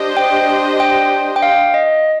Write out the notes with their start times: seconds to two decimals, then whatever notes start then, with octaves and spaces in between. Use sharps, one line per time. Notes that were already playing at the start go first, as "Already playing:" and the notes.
Already playing: D4 G4 C5 D#5
0.17 G5
0.80 G5
1.36 G5
1.42 F5
1.74 D#5